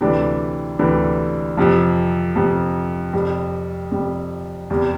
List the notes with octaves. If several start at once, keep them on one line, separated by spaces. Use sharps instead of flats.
D2 C3 E3 G3 D4
D2 C3 E3 G3 D4
F2 C3 F3
F2 C3 F3
F2 C3 G3
F2 C3 G3
E2 C3 G3